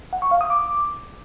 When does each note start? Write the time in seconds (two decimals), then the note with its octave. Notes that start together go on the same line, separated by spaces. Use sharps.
0.13 F#5
0.22 C#6
0.31 F5
0.41 D#6
0.50 D6